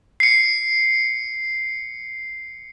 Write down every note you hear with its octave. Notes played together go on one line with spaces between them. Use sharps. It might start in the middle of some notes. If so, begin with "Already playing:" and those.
C7 C#7